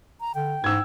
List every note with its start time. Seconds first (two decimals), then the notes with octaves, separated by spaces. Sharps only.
0.20 A#5
0.35 D3 G5
0.64 G#2 E6 G#6